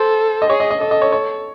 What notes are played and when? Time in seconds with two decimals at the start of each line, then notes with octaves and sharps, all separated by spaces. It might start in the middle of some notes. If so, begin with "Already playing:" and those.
Already playing: A4 C5
0.42 D#5
0.50 G#4 C#5
0.60 D#5
0.71 D#5
0.81 A4 D#5
0.91 D#5
1.02 C#5
1.12 C#5